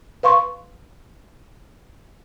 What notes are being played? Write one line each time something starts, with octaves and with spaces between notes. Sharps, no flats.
B4 F5 C6 C#6